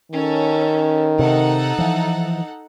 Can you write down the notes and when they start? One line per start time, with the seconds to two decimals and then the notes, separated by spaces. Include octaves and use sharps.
0.12 D#3 C#4 A4
1.19 C3 D#4 A4 F#5
1.78 E3 F3